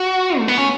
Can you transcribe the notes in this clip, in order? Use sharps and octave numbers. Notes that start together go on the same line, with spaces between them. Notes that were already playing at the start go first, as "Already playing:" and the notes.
Already playing: F#4
A3
B3
C#4